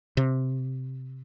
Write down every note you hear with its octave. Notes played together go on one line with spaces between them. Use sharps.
C3